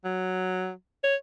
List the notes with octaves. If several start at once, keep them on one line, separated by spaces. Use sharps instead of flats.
F#3
C#5